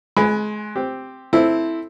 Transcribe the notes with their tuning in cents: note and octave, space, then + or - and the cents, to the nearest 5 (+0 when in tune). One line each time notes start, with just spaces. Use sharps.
G#3 +30 G#5 +0 B5 +5
C4 +0 G4 +0
C4 +0 E4 +0 A4 +0